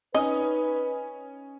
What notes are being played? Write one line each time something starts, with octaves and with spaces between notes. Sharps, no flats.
C#4 D#4 B4 D#5 G#5 D#6